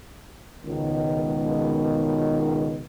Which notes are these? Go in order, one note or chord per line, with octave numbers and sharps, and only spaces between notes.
C#2 B2 D#3